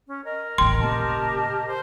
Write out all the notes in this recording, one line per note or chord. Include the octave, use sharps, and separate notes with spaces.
C#4
A#4 D#5
D#1 A1 G5 C6
A#2 C#3 G4 D#5 A5
C5